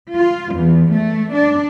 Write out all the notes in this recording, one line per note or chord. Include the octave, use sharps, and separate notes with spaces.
F4
E2
A3
D4